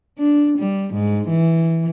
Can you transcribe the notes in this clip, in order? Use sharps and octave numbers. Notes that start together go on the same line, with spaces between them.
D4
G3
G#2
E3